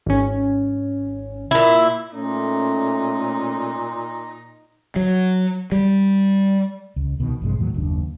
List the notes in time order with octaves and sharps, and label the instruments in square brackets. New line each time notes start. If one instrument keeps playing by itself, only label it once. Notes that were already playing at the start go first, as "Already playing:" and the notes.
[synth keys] G#1 C#4
[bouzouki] A#2 E4
[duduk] A#2 [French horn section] A3 C#4 [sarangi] D#4
[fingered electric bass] F#3
G3
[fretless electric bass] C#2
C2 B2 D3 D#3
A#1 G2 C3 G#3
E2 A2 D#3 F#3
F#1 D#2 D4